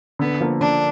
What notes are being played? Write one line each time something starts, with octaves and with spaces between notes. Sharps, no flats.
D3 B3
F3 A#3
D3 D4